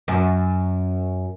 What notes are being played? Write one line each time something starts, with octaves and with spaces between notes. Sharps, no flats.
F#2